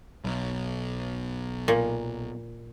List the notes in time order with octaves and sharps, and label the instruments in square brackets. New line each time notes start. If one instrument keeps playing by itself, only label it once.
[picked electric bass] B1
[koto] A#2